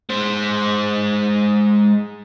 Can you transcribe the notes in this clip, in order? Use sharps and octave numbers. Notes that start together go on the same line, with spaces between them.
G#3 C5